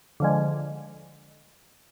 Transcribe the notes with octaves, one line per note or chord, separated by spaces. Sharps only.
D3 F3 G#3